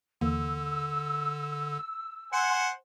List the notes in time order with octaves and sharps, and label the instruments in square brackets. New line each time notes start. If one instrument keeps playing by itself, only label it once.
[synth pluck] D#2 E3 A#3 [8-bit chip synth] D3 [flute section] E6
[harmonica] C5 F#5 G#5 [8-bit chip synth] C#7